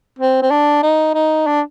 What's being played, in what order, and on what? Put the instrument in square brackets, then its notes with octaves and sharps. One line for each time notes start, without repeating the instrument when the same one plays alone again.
[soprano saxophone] C4
C4
D4
D#4
D#4
D4